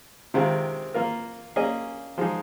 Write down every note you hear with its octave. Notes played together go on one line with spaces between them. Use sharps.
C3 D#3 G#3 C4 F4
A#3 F4 A#4
A#3 C#4 G#4 D#5
F3 G#3 D#4